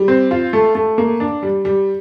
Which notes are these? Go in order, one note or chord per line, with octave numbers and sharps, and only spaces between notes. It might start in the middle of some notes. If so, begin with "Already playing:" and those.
Already playing: G3
C4
F4
A3
A3
A#3
D4
G3
G3